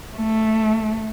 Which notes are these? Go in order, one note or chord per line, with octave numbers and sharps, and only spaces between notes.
A3